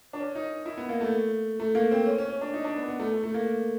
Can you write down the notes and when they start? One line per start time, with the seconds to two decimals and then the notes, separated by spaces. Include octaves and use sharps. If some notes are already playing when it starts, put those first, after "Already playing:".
0.13 D4
0.20 C#4
0.35 D#4
0.66 E4
0.78 B3
0.89 A#3
1.01 A3
1.60 A3
1.75 A#3
1.91 C4
2.06 C#4
2.18 C#4
2.30 C#4
2.41 D4
2.54 D#4
2.64 D4
2.76 B3
2.88 B3
3.00 A3
3.12 A3
3.24 A3
3.34 A#3